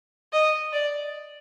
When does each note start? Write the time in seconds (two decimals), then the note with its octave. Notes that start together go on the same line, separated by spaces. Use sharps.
0.33 D#5
0.73 D5